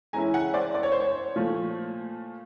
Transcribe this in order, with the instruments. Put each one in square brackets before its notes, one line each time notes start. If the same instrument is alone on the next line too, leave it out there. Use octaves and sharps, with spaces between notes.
[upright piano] E3 G#3 C#4 E4 G#5 A#5
F#5 G#5
C5 D5
D5
C#5
C5
C#5
A#2 F3 A3